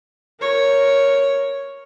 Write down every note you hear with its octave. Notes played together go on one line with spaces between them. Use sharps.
A#4 C#5